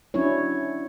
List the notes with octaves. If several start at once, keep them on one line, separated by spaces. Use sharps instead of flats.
F#3 C#4 D4 E4 C#5